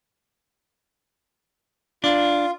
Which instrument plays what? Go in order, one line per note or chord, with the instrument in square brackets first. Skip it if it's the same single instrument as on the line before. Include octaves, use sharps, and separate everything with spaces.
[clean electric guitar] D4 [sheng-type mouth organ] F4